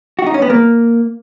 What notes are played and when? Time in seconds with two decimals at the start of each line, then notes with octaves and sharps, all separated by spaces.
0.19 F#4
0.26 D#4
0.34 C#4
0.42 B3
0.50 A#3